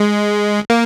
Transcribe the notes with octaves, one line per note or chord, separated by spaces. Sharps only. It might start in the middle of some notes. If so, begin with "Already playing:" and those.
Already playing: G#3
A#3